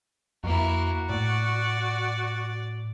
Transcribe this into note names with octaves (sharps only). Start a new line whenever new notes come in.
F2 A#3 E4 F#4
A2 D5